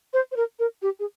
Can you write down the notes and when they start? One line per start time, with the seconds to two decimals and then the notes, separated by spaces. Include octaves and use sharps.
0.13 C5
0.32 C5
0.36 A#4
0.59 A#4
0.82 G4
1.00 G#4